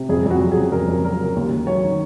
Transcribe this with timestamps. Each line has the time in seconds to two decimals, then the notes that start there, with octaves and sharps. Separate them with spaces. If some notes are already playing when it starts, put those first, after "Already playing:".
Already playing: C3
0.09 F2 G#4
0.26 F2 F#4
0.41 F#3
0.51 G#4
0.57 C#3
0.72 F2 A#4
0.88 F2
1.04 F#3 A#4
1.20 C#3
1.36 D#2
1.52 D#2
1.67 F#3 C#5
1.84 D#3